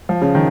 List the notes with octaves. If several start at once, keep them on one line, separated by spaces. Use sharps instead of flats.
F3
C#3
D#3